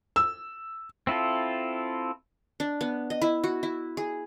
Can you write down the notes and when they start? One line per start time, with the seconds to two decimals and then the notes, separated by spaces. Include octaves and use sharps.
0.16 E6
1.07 C4 E4 F4 A4
2.60 D4
2.81 B3
3.10 D#5
3.22 E4
3.44 F#4
3.63 E4
3.97 G#4